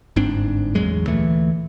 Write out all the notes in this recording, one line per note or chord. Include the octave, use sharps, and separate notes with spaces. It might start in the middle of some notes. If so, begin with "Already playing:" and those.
G1 G#2 C4 D4
A1 E2 F#3 G#3
D2 A#2 E3 A3